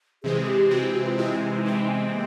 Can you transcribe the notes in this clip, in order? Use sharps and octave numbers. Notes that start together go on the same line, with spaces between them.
C3 E3 G#3 C4 G#4
G4
C3 E3 G#3 C4 F#4
G4
F#4
F4
C3 E3 G#3 C4 E4
E4
C3 E3 G#3 C4 D#4
B3
A#3